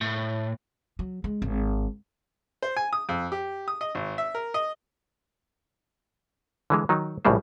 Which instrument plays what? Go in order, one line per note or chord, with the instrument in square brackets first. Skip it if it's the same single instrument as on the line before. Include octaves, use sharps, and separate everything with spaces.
[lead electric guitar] A2
[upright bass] F#3
G#3
G#1
[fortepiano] C5
G#5
D#6
F2
G4
D#6
D#5
G#1
E5
A#4
D#5
[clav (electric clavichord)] D3 E3 G#3
D#3 F#3 D#4
A#1 A2 C#3 G3 G#3 C5